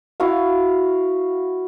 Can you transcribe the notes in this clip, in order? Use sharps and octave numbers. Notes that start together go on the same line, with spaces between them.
E4 F#4 F5